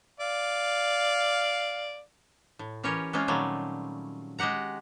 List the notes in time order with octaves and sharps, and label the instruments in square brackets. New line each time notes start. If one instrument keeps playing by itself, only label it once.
[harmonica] D5 F5
[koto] A2
E3 C#4 G4 A#4 C#5
G#3 A#3 C4 C#4 F4
A#2 D#3 F#3 G3 A3
G#3 F#4 G4 F#5 A#5